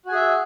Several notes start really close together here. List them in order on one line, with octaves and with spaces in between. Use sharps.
F#4 G#5 G#4 E5